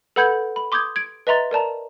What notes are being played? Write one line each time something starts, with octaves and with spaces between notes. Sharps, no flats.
A4 B4 F#5 B5 G6 G#6
B5
C6 D6 D#6 G6 G#6
G#6 D7
B4 D#5 E5 A#5 C6 A6
A#4 D5 A5 A#5